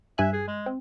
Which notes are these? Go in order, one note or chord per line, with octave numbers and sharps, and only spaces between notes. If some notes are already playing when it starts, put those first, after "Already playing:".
G2 E5 G#5 F#6
G#4
G#3
C4